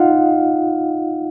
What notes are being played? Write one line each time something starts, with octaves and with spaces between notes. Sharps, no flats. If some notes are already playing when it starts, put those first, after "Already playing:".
Already playing: D#4 F4 D#5 F5 F#5